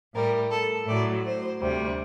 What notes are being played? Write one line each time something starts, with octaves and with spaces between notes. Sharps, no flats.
A2 G3 A#4
A4
A2 F#3 D5
C5
D2 C3 G3